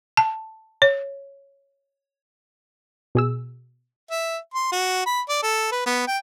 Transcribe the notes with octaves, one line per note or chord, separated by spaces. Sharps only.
A5
C#5
B2 G#4 E6
E5
C6
F#4
B5
D5
A4
B4
B3
G5